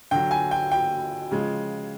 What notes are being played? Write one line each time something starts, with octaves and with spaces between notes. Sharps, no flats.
D3 F#3 G5
G#5
G5
G5
C#3 F3 G#3